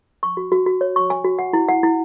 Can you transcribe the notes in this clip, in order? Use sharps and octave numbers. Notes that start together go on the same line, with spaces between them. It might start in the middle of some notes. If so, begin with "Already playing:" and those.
C#6
F#4
F#4
F#4
C#5
C#6
G#5
F#4
F#5
E4
F#5
E4